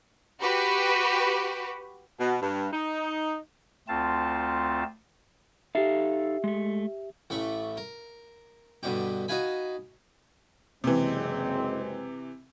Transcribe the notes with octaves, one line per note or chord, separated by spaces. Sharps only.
F#4 G4 B4
B2
G2
D#4
D2 A3 C4 F4 A5
D#4 G4 A4 E5 F5
G#3 A3
A1 A3 B5 C#6
A#4
G2 B2 D3 G4
D#4 F#4 B4 F5 G#5 B5
F#1 C3 E3 G#3 C4